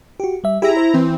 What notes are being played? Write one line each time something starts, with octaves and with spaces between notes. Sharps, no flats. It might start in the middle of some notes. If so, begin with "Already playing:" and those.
F#4 G4
G3 E5
E4 G4 G#4 E5 A#5
C5
E3 C4